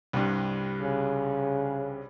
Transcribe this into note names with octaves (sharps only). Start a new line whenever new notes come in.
C2 G2
C#3